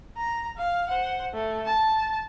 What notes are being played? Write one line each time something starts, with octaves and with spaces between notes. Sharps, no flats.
A#5
F5
C5 F#5
A3
A5